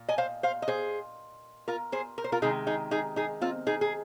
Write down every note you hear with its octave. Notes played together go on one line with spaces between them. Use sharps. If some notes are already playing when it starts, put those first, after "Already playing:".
Already playing: A#2
D#5 G#5
C5 F5
C5 F5
D#5
G#4 C5
F4 A#4
G#4 C5
A#4
C5
F4 A#4
C3 D#3 G#3 D#4 G#4
D#4 G#4
D#4 G#4
D#4 G#4
C4 F4
D#4 G#4
G#4